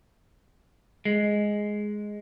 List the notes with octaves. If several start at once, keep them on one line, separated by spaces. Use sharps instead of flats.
G#3